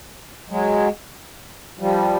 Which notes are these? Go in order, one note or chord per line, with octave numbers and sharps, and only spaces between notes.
F#3 G#3
F3 G3